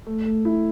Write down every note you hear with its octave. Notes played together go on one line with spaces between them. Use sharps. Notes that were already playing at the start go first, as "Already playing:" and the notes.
A3
A3
E4